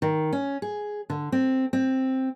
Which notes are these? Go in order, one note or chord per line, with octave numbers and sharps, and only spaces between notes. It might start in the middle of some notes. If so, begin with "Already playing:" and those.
D#3
C#4
G#4
D3
C4
C4